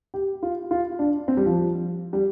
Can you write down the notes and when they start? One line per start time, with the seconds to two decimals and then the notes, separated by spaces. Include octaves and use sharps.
0.14 G4
0.43 F4
0.71 F4
0.99 D4
1.28 C4
1.37 G3
1.46 F3
2.13 G3